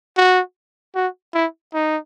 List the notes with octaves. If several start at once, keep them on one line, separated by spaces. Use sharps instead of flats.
F#4
F#4
E4
D#4